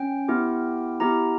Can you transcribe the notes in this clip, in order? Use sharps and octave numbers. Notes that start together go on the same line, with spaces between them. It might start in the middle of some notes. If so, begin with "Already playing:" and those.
Already playing: C#4 G5
B3 E4 G4
B3 E4 G4 A#5